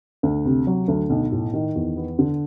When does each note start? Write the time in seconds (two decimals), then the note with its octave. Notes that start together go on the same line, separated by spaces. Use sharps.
0.23 D2
0.45 C3
0.67 F#3
0.88 D2
1.10 B1
1.32 A2
1.53 D#3
1.75 E2
1.97 B3
2.19 D3